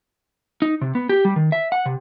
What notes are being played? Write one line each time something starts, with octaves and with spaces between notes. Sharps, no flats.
D#4
C3
B3
G4
G3
D#3
E5
F#5
C3